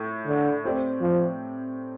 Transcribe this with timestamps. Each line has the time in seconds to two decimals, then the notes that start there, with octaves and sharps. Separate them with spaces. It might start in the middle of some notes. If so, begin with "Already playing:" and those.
Already playing: A2
0.27 D3
0.64 A3 C4 G4 D5
1.01 F3